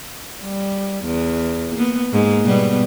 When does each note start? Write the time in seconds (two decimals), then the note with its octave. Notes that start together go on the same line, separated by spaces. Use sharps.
0.43 G3
1.05 E2
1.76 A#3 B3
2.10 G#2 A#3
2.43 B2 G3 B3